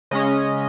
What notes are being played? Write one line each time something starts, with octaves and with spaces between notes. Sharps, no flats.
C#3 G#3 C#4 D#5